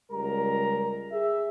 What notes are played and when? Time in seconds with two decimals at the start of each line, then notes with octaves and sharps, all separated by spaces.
0.12 C#2 G3 A#4 A#5
1.12 G#4 E5